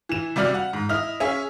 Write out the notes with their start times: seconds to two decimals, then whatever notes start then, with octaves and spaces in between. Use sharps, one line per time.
0.09 E3 E7
0.36 C3 G3 F#4 D5 F6
0.54 F#5
0.73 G#2
0.89 E4 D#5 F6
1.20 C#4 G#4 E5